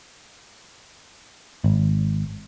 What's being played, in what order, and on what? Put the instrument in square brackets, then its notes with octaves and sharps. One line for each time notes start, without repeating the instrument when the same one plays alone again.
[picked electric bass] G#1